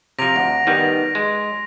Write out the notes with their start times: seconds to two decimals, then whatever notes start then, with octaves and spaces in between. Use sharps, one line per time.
0.19 C3 F3 A#5 A#6 D7 F7
0.36 D2 F#5
0.67 D#3 G3 B3 D#4 B4
1.15 G#3 C6